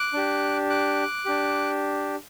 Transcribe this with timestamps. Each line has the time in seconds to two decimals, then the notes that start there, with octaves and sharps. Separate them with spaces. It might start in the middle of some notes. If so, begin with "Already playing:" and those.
Already playing: D6 F#6
0.13 D4 G4
0.70 D6 F#6
1.25 D4 G4